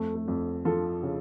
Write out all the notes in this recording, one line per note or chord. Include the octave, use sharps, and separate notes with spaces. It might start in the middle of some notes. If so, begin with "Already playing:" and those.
Already playing: F2 A3
A3
F2
F3 F4 A4
C#3